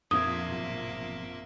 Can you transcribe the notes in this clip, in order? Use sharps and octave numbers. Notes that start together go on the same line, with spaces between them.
A#1 F2 F3 A#3 C4 E5 D#6 G#6
G#1 F#2 B2